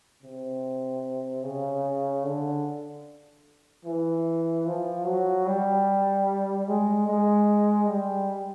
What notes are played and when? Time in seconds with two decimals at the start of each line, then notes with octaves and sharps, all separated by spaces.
0.23 C3
1.44 C#3
2.24 D3
3.85 E3
4.66 F3
5.06 F#3
5.46 G3
6.67 G#3
7.07 G#3
7.87 G3